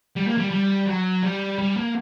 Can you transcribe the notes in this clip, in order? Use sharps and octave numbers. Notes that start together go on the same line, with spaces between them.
G3
A#3
G3
G3
F#3
G3
G3
A#3